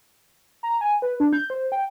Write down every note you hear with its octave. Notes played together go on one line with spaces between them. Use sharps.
A#5
G#5
B4
D4
G6
C5
G5